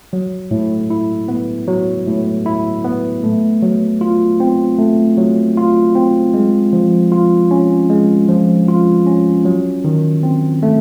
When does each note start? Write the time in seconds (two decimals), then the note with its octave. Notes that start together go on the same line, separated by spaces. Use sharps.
0.13 F#3
0.51 A2
0.90 E4
1.28 B3
1.67 F#3
2.06 A2
2.46 E4
2.84 B3
3.24 A3
3.62 F#3
4.01 F4
4.40 C4
4.78 A3
5.18 F#3
5.57 F4
5.95 C4
6.34 G#3
6.73 F3
7.12 F4
7.51 C#4
7.90 G#3
8.29 F3
8.68 F4
9.07 C#4
9.45 F#3
9.84 D#3
10.23 C4
10.63 A3